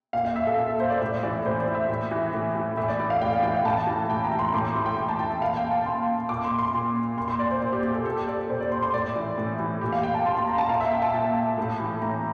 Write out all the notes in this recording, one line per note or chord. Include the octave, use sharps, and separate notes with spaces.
A#2 F5
F5
E5
A4
A#2
A4
C5
D5
A2 E5
E3 D5
A2 C5
D5
E3
E5
A2
E3
A2
E3
A2 E5
D5
E3 D5
F5
A2 G5
F5
E3 G5
F5
A2 A5
E3
A2 G5
A#5
E3
C6
A2 D6
C6
E3 C6
G5
A2 G5
A5
E3 G5
E5
A#2 F5
G5
A5
A#2 C6
A#2 D6
C6
C6
A#2
A#2 C6
C6
D5
C5
A#2
G4
G4
A4
A#2 A4
G4
D5
A#2 C5
D5
C6
C6
A2 D5
E3
A2
E3
A#2 G4
F5
G5
A5
A#2 C6
C6
A#5
A5
A#2 F5
E5
G5
A5
A#2
A2
E3
A2 A#5